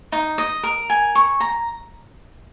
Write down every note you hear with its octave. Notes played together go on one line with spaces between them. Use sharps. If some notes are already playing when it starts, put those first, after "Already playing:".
D#4
D#5
A#4
G#5
C#6
A#5